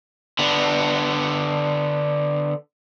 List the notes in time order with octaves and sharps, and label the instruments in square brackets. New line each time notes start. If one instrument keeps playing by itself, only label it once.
[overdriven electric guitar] D3 B3